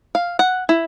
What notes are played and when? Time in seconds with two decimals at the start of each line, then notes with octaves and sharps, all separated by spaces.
0.15 F5
0.39 F#5
0.69 E4